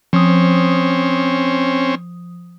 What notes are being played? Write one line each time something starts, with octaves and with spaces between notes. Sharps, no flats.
F3 C4 C#4 D#6